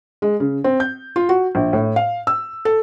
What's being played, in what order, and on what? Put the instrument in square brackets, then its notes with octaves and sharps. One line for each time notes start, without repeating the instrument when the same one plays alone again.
[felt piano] G#3
C#3
C4
G6
F4
F#4
A#1
A2
F5
E6
A4